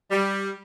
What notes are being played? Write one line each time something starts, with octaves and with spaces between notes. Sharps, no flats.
G3